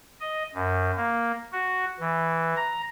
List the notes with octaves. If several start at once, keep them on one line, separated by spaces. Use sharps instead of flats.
D#5
F#2
A#3
F#4
E3
A#5